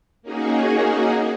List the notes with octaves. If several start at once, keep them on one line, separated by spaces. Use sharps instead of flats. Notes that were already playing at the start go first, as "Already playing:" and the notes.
A#3 C#4 D#4 F#4 G#4